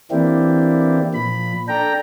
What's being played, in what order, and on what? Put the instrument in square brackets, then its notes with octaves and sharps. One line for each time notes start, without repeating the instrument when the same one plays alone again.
[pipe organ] E3 A#3 C4 D4 E4 G4
A#2 F3 B5
D4 A4 G5 A#5